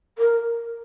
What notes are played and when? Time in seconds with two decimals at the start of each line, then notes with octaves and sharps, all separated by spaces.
0.18 A#4